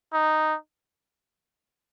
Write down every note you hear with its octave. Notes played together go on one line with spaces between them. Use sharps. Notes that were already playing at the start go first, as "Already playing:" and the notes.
D#4